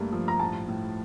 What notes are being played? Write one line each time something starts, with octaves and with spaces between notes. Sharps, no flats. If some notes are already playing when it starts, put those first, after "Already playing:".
Already playing: G2 A3 A#3
F3
A#5
A2 A5
A2